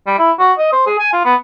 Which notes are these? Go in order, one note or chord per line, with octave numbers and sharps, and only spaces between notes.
G3
E4
F#4
D#5
C5
G#4
G#5
F4
B3